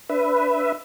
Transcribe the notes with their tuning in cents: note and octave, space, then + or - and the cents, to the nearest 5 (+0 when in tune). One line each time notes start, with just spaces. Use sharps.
D4 -20 B4 +10 E5 +0